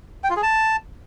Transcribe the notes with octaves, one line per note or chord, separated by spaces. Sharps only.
G5
F4
G#4
A5